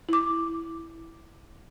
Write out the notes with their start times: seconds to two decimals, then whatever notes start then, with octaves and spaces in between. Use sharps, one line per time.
0.09 E4 D6